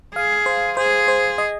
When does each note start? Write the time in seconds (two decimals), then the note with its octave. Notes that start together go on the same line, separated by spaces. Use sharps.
0.15 G#4 F5
0.46 C5
0.77 G#4 C5
1.08 C5
1.38 D#5